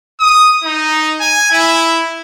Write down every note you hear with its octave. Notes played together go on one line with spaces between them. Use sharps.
D#6
D#4
G#5
E4